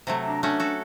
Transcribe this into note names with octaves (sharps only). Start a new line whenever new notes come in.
C3 F#3 A3
D4 A#5
A3 C#4 D4 F#4
F#4 A4